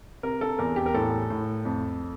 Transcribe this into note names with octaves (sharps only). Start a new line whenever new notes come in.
C3 A#4
A4
E2 A#4
G4
A#4
A2 A4
A2
F2